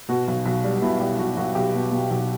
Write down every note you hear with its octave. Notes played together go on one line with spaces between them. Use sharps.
B2 F#4
B1
B1
G3
B2 E4
G3 G4
B1 F#4
B1 F#4
B1 G4
B2
B2
B1